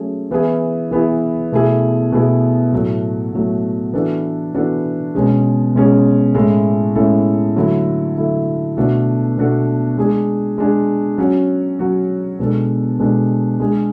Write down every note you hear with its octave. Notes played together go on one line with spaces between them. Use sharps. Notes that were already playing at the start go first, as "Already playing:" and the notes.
Already playing: F#3 A3 C#4 G#4
E3 B3 E4 G#4
E3 B3 E4 G#4
B2 A3 E4 G#4
B2 A3 E4 G#4
A2 F#3 A3
A2 F#3 A3
E3 B3 D4 F#4 A4
E3 B3 D4 F#4 A4
B2 G#3 C#4 G#4
B2 G#3 C#4 G#4
A2 G#3 C#4 E4 A4
A2 G#3 C#4 E4 A4
D3 F#3 A3 E4 A4
D3 F#3 A3 E4 A4
B2 A3 D4 F#4 A4
B2 A3 D4 F#4 A4
G#3 D4 G#4
G#3 D4 G#4
F#3 C#4 F#4
F#3 C#4 F#4
B2 G#3 D4 A4
B2 G#3 D4 A4
G#3 D4 G#4